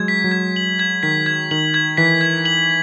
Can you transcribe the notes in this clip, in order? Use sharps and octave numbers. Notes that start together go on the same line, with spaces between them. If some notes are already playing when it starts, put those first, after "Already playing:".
Already playing: F#3 G#3 G#6
B6
F#3
G#6
F#7
G#6
D#3 B6
G#6
D#3 F#7
G#6
E3 B6
G#6
F#7